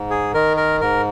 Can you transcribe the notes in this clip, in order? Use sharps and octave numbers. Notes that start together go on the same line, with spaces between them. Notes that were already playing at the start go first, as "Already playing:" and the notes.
Already playing: G#2
G#4
D#3 A#4
A#4
G#2 A#4